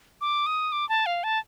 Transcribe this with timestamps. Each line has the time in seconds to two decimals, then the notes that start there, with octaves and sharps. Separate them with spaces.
0.21 D6
0.46 D#6
0.72 D6
0.89 A5
1.06 F5
1.24 A5